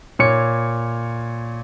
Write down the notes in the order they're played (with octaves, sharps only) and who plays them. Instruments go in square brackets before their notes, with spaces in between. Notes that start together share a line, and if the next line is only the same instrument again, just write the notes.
[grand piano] A#2 C#5 C#7